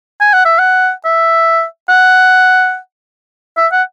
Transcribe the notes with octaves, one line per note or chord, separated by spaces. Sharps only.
G#5
F#5
E5
F#5
E5
F#5
E5
F#5